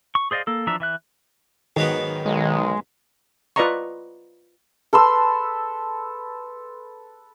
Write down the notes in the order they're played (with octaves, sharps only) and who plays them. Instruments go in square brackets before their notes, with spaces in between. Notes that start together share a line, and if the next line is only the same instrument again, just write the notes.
[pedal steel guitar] C#6
G#4 C5 D5 D#5 F5
A#3 A4
E3 F3 D4 E5 A#5
E3 E5 F#6
[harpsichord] G#2 F#3 B3 [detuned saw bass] D#3
[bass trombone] B1 [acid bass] G#3
[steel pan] F4 B4 D5 D#5 A#5 C#6
[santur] A4 B4 C6 E6